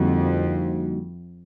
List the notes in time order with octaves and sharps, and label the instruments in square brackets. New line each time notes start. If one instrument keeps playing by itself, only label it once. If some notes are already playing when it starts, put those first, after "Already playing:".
Already playing: [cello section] F2 [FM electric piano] D3 G3 A#3 D#4 F#4